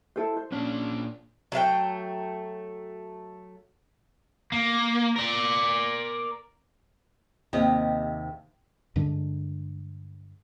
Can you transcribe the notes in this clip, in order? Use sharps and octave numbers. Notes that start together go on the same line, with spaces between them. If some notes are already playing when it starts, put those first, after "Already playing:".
E4 A4 C5
C5
A#2 C#4 D4
F#3 A3 F5 G5
A#3
A#4 D5
D#2 C3 D#5
G2 D3 G#3 D4